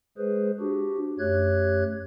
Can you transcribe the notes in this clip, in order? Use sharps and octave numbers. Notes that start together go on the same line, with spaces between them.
G#3 G#4 B4 C5
D4 F#4 G4
F#2 A3 G4 C#5 F#6 G#6